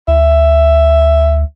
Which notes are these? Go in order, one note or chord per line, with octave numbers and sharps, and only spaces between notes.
D2 E5